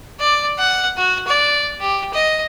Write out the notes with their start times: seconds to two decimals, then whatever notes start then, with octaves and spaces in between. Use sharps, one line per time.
0.20 D5
0.58 F#5
0.97 F#4
1.28 D5
1.81 G4
2.14 D#5